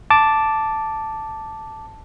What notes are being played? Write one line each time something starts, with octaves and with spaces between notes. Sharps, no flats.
A5 D6